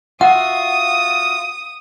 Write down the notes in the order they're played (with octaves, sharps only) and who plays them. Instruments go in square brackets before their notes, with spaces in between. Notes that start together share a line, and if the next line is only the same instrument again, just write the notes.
[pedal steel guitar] F4 F#4 E5 [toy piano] F#5 [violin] D#6